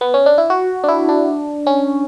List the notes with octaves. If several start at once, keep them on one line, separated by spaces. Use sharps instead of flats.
B3
C#4
D4
E4
F#4
D4
E4
D4
C#4